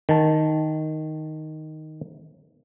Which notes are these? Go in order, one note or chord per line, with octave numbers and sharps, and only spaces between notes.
D#3 A5